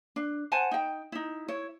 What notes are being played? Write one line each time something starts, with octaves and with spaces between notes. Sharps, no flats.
D4
C5 F#5 G#5 A5
D#4 G5
D#4 E4
E4 C#5